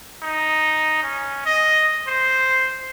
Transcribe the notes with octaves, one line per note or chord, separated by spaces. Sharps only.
D#4
C#4
D#5
C5